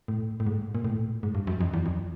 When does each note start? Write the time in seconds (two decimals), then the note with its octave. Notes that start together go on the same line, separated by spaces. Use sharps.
0.08 A2
0.40 A2
0.47 G#2
0.75 A#2
0.85 A2
1.23 G#2
1.35 G2
1.47 F#2
1.61 F2
1.74 E2
1.86 F2